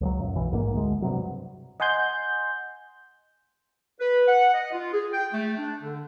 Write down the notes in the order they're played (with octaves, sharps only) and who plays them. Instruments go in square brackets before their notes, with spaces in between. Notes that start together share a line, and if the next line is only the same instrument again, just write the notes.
[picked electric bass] C#2 F3 F#3
F#2 A#2
B1 B2 E3
A#1 G#2 C#3 A#3
D2 G#3
G2 C3 F#3
[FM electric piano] D#5 F#5 G#5 C6 G6
[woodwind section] B4
F#5
D#5
F4
G#4
G5
A3
D4
D3